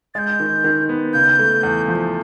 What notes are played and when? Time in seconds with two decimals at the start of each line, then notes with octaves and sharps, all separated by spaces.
0.14 G#3 G6 A6
0.40 D#3
0.64 D#3
0.89 B3
1.13 C#3 G6
1.39 A3
1.63 E2
1.88 F3